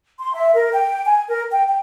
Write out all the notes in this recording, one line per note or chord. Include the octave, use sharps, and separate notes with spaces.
C6
E5
A#4
G5
G#5
A#4
G5
G5